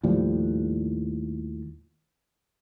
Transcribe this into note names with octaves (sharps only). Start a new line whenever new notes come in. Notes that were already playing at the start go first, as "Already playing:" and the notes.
D#2 A2 F3 G3